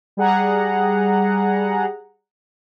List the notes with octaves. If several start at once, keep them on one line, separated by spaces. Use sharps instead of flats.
G3 G#4 F#5 A#5